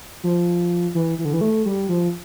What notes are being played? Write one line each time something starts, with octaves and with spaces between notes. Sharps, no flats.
F3
E3
E3
D3
E3
A3
G3
F3